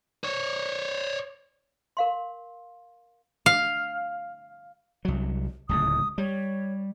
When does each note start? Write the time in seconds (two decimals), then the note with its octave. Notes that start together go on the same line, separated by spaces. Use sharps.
0.24 C5 C#5
1.97 A#4 F5 C6
3.46 F5
5.05 C2 F#3
5.69 D1 C#2 A2 D#6
6.18 G3 C#5